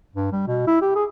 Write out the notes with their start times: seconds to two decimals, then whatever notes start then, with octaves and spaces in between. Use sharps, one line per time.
0.16 G2
0.33 G3
0.48 B2
0.67 E4
0.82 G4
0.96 G#4